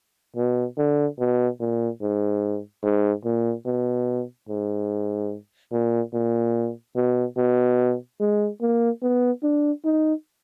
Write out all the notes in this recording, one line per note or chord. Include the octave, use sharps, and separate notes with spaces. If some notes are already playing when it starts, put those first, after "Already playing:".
B2
D3
B2
A#2
G#2
G#2
A#2
B2
G#2
A#2
A#2
B2
B2
G#3
A#3
B3
D4
D#4